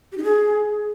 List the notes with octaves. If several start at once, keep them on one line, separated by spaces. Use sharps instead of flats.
G4
D#4
G#4